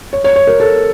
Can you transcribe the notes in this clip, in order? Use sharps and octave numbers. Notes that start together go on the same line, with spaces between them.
C#5
C#5
C#5
A#4
A4